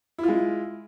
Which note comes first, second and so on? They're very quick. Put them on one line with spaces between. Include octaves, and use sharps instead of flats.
E4 F4 G#3